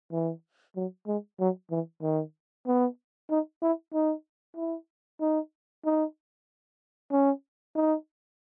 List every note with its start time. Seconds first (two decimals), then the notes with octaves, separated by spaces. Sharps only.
0.12 E3
0.76 F#3
1.07 G#3
1.40 F#3
1.71 E3
2.02 D#3
2.67 B3
3.30 D#4
3.62 E4
3.94 D#4
4.57 E4
5.21 D#4
5.85 D#4
7.11 C#4
7.75 D#4